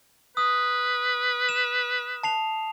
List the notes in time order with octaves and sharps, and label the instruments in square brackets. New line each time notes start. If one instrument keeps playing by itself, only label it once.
[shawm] B4 [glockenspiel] D#6
[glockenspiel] E7
A5 C7 F7